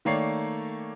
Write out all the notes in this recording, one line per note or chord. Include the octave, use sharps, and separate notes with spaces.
D#3 A3 A#3 C#5 D5 C7